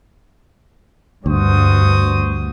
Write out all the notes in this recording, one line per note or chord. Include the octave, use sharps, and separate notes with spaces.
D2 G2 F#4 C5 D#6